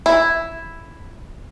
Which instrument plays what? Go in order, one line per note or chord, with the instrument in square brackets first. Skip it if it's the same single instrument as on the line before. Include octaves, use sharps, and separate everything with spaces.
[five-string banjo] E4